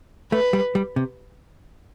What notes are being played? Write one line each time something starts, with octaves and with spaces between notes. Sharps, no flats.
A3 B4
G3
G3
C3